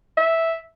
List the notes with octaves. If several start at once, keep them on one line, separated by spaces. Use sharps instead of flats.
E5